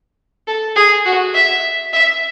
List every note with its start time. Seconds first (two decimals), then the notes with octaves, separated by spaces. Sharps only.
0.47 A4
0.76 G#4
1.05 F#4
1.34 E5
1.93 E5